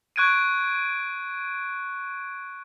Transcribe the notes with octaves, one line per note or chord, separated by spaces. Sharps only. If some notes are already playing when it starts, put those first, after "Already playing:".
C#6 F#6 G#6 D7 D#7